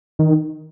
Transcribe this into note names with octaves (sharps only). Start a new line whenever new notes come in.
D#3